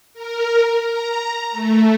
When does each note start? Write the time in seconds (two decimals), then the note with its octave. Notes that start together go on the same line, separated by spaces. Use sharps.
0.14 A#4
0.83 A#5
1.51 A3